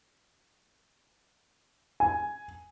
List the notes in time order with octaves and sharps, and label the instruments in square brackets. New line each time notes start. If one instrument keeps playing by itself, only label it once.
[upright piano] G#5